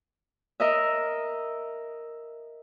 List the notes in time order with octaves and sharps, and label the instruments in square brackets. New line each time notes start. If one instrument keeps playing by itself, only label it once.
[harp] A#4 D#5 E5